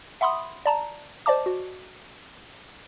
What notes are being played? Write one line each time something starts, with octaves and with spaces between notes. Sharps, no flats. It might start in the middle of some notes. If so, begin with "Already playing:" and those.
E5 F#5 B5 C6 D#6
D5 A5 A#5
C5 D5 D#5 A5 D6
F#4